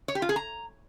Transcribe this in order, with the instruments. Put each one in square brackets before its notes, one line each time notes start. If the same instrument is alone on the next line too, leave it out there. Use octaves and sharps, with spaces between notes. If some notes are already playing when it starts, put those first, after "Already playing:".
[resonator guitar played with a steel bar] C#5
G4
F4
G#4
A#5